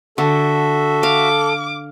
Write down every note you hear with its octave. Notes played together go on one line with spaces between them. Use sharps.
D3 F#4 A4 E5
F5 D6